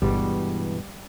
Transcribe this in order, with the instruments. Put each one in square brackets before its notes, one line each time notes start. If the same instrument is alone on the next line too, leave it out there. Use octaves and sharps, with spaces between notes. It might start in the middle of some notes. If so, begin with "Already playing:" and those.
[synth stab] G1 [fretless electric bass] G2 B2 [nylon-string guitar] E3 G#3 B3 [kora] G3